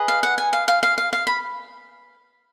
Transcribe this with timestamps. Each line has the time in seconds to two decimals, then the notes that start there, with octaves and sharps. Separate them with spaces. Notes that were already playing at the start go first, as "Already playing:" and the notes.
Already playing: G#4 B4 D#5
0.08 F5
0.23 F#5
0.38 G#5
0.53 F5
0.68 F5
0.83 F5
0.98 F5
1.13 F5
1.27 B5